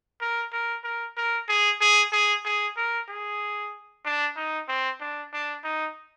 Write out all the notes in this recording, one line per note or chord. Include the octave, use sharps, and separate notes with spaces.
A#4
A#4
A#4
A#4
G#4
G#4
G#4
G#4
A#4
G#4
D4
D#4
C4
D4
D4
D#4